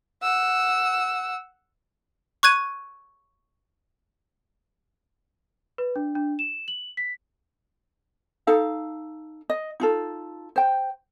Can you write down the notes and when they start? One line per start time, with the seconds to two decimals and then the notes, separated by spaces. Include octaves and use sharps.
0.23 F#5 E6
2.43 C#6 F#6 G#6 D#7
5.78 B4
5.96 D4
6.15 D4
6.39 E7
6.68 F#7
6.97 B6
8.47 D#4 A4 F5
9.50 D#5
9.80 D#4 F4 A4
10.56 C5 G5